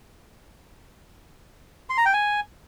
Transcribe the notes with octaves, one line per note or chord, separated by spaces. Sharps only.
C6
A#5
G5
G#5